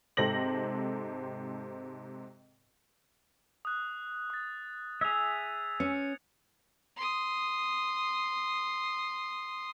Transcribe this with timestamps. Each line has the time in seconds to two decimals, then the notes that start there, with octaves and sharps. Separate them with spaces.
0.17 G#2 C3 C4 A4 A#6 F#7
3.65 D#6 F#6
4.30 D#6 A6
5.01 G#4 E5 G#6 F7
5.80 C#4 C#7
6.96 C6 D#6